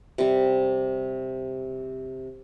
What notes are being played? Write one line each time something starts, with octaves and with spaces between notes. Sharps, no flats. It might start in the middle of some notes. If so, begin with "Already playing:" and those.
C3 G3